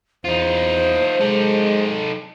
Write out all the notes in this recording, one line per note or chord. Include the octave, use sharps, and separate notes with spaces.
E2 D#4 F4 C5
G#3 D#4 A4